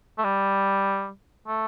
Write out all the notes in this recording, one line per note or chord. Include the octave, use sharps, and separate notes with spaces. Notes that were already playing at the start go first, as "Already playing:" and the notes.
A3
G3
A3